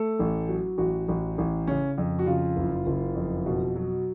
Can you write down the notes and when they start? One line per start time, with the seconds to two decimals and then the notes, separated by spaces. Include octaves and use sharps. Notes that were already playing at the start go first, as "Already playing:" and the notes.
Already playing: A3 A4
0.19 A1
0.49 F#3
0.78 A1 F#4
1.08 A1
1.38 A1
1.67 C#3 C#4
1.98 F2
2.19 F#4
2.26 C#3 F4
2.57 F#1
2.87 F#1
3.15 F2
3.46 B2
3.76 F#3